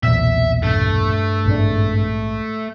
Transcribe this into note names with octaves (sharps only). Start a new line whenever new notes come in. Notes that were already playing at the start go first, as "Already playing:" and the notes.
B1 E2 A#2 E5
G2 A3
A#1 G#2 D4